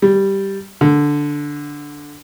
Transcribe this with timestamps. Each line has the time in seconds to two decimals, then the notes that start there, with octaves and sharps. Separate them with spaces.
0.02 G3
0.81 D3